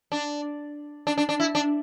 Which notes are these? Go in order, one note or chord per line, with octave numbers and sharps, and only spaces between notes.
D4
D4
D4
D4
E4
D4